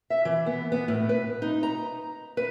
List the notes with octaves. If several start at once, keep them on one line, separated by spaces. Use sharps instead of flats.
E5
E3
B3
B3
A2
B4
D#4
A#5
B4